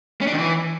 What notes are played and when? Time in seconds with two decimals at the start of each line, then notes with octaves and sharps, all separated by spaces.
0.21 C#4
0.27 D4
0.33 D#3
0.38 E3